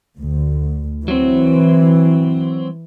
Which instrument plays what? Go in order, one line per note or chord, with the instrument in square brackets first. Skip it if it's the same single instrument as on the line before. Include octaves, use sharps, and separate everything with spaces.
[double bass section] D2
[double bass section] E3 [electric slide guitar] F#3 C4